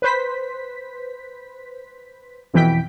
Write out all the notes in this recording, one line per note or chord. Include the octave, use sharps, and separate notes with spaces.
B4 C5 B6
F2 B2 E3 G5 B6 D7